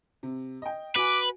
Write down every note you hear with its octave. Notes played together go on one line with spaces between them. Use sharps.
C3
D#5 G5
F#4 B4 G#5 D6